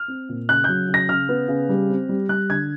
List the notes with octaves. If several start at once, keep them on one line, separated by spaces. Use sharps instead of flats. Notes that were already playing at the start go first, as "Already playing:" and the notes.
Already playing: F6
C4
A#2
C#3 F#6
F#3 G6
C#3
A#6
C#3 F6
B3
C#3
G3
C4
G3
G3 F#6
D3 G#6